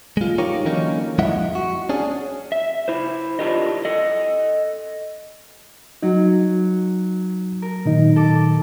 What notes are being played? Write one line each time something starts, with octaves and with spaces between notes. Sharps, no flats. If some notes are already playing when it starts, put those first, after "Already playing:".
G#3 F4
D#4 F4 G4 A#4 C#5
D3 E3 F#3 A#3 C#4 D#4
F2 G#3 E4 D#5 E5 F#5
F#4
C#4 D4 G#4
E5
E4 C5
D4 E4 F4 G4 A#4 D#5
A4 D#5
F#3 D#4
A#4
A#2 D#3 D#4
A4 D6